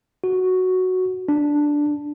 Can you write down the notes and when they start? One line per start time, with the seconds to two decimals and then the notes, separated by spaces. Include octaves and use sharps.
0.24 F#4
1.29 D4